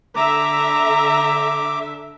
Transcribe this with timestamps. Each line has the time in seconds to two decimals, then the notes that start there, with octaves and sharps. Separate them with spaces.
0.16 D3 E5 A#5 D6